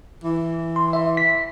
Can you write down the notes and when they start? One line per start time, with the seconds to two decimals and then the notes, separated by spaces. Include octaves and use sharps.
0.24 E3
0.76 C6
0.93 E5
1.17 B6